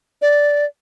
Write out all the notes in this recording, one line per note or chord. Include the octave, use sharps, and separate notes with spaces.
D5